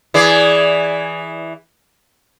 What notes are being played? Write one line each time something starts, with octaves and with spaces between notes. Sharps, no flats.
E3 G#4 D5